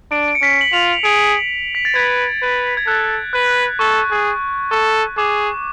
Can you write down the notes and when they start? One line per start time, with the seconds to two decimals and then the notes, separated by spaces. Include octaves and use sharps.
0.11 D4 D7
0.28 D7
0.35 C#7
0.42 C#4 B6
0.61 F#7
0.72 F4 F7
1.04 G#4 D7
1.75 B6
1.85 A6
1.95 B4 G#6
2.42 B4
2.77 G#6
2.87 A4 F#6
3.33 B4 F#6
3.79 A4 C#6
4.11 G#4
4.71 A4 C#6
5.17 G#4 D6